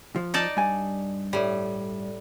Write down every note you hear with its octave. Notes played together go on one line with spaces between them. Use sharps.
F3
D#4 D5 A5
G2 G#5
A2 G3